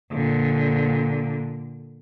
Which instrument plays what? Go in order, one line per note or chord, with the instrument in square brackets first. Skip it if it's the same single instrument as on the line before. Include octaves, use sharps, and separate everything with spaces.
[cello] A#2 D3